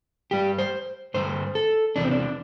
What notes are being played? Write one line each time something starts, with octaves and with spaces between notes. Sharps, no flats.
G2 G3 G4
C5
G2 D3 G3 C5
A4
E2 C3 E3 D4
C4
D4